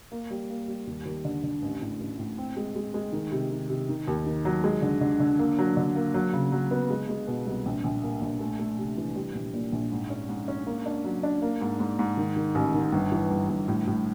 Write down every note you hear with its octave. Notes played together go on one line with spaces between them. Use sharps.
A#3
G3
A#3
G3
D#2
D#2
D3
D3
A1
A2
A1
A2
C4
G#3
G#3
G#3
D#3
C3
D#3
C3
D#3
D#2
D#3
F#3
G#3
D3
D3
D3
A#3
F#3
D3
A#3
F#3
C#3
F#3
B3
G#3
G#3
B2
C2
A#1
A#1
A#3
A#1
A3
A3
C3
E3
G3
A#1
A#2
A#1
G#2
C#4
G#2
C#4
A#3
D4
F#3
D4
A#3
G#2
G#2
G#2
D#3
D#3
A1
D#3
G1
E3
G1
G1
A2
A2